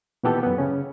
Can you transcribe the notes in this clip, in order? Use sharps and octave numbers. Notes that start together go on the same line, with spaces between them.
A#2 D#3 E3 B3 G4 A4
F#2 B3
C#3 C#4